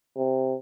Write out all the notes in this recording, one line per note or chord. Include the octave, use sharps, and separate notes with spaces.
C3